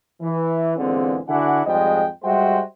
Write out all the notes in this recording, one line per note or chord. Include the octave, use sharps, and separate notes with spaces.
E3
E2 A#2 D3 G#3 C4
D3 D4 E4 F#4 F#5 G#5
F2 G#2 G3 G#3 D#5 G5
G3 G#3 F#4 C5 E5 G5